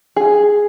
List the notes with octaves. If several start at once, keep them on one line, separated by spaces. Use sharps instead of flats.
G#4